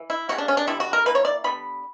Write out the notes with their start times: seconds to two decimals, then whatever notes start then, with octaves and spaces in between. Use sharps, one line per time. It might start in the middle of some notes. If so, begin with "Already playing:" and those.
Already playing: E3
0.10 E4
0.29 C#3 G3 A#3 F#4
0.38 D4
0.48 C#4
0.57 D4
0.67 D3 G3 B3 E4
0.80 F#4
0.93 A#4
1.06 E3 A#3 B4
1.15 C#5
1.25 D5
1.44 D3 G3 B3 B5